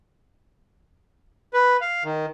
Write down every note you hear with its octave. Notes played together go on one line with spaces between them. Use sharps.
B4
F5
D#3